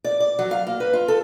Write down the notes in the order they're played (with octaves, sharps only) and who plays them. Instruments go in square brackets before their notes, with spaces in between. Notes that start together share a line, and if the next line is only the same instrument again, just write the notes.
[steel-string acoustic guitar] D5
D5
F#3
F5
A#3
B4
F4
A4